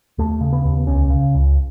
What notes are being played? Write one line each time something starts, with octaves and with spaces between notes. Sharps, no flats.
D#2 A3
C#3
B3
D#2
C#2 C#4
C#3
C#2